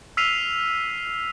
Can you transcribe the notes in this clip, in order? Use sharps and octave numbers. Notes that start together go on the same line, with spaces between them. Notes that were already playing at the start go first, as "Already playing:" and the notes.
E6 F6 B6 C7 D#7 F7